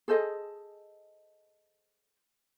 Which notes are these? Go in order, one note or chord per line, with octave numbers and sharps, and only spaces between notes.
G#4 A4 C5 D#5